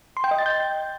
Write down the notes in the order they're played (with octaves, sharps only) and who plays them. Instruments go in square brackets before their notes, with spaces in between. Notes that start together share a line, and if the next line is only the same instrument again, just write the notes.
[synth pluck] C6
G5
D#5
A6
G6